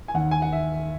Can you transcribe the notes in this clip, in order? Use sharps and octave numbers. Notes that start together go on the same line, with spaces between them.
G#5
D#2 D#3 F#5
G#5
F#5
E5